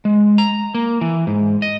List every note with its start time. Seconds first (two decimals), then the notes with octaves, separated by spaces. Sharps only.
0.05 G#3
0.38 A#5
0.75 A#3
1.01 E3
1.27 G#2
1.62 D#5